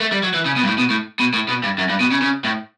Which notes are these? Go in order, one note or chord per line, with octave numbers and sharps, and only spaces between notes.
A3
G3
F#3
E3
C#3
B2
G2
A2
B2
A2
B2
A2
B2
G2
F#2
G2
B2
C#3
C#3
A2